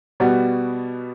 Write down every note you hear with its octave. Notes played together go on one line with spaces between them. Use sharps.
B2 G3 B3 F#4